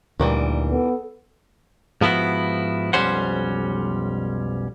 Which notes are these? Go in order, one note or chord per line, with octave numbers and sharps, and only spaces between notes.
D2 A#2 D#3 E3 G3
B3 A4
G#2 F3 B3 E4 F#4
B1 F2 G3 C#4 C5 F#5